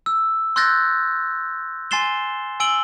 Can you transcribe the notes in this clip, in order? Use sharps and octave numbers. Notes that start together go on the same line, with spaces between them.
E6
C6 E6 F#6 G6 A6 A#6
G#5 C6 A6 C7 E7 G7
G#5 E6 D7 F#7 G7